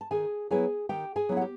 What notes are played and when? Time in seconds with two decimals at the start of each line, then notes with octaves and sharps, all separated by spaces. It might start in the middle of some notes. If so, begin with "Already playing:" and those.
0.01 A5
0.11 D#3 G#4 G#5
0.50 F#3 B3 E4 G#4 G#5
0.89 D#3 G4 G5
1.16 G#4 G#5
1.29 F#3 B3 E4
1.37 F#5
1.41 G4